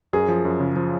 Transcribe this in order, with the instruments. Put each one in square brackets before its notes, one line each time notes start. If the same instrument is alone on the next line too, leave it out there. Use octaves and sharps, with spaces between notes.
[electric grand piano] F#2 [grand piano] G#4
[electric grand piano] F3
F#2
C#3
F3